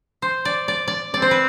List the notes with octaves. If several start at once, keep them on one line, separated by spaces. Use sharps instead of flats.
C5
D5
D5
D5
C4 D5
C5
B4